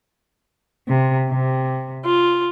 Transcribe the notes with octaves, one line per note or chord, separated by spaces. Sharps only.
C3
C3
F4